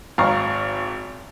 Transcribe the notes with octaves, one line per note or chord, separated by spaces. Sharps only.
G#1 F5 A#5 C#6